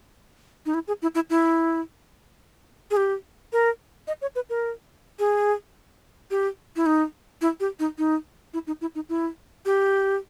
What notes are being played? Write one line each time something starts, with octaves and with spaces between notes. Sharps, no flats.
D#4
E4
G#4
E4
E4
E4
G#4
G4
A#4
D#5
C#5
B4
A#4
G#4
G4
E4
D#4
E4
G4
D#4
D#4
E4
D#4
E4
D#4
E4
G4